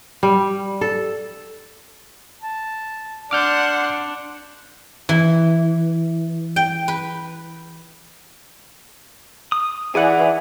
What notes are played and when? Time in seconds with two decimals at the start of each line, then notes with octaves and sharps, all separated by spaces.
0.23 G3
0.81 A4
2.42 A5
3.31 D4 D5 F#5 A5 C6 D6 F6 G6
5.09 E3
6.56 G5
6.88 B4
9.52 D#6
9.95 E3 G#4 D5 F#5 G#5